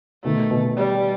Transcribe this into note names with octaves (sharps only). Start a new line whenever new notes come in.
B2 D#3 A3
B2
G3